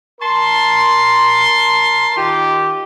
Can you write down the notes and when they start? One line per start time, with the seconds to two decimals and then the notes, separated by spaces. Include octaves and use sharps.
0.21 A#4 A5 C6
2.16 D#3 F4 G4